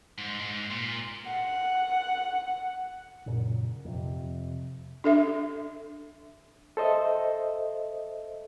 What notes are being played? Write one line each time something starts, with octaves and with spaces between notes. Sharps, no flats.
G#2
G#2
A#2
F#5 F#6
F#2 A#2 C#3
F2 C3
D4 A4 E5
A4 C5 D#5 E5